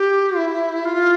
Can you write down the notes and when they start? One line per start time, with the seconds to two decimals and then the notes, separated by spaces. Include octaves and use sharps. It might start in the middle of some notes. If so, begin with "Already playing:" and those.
Already playing: G4
0.37 E4
0.85 F4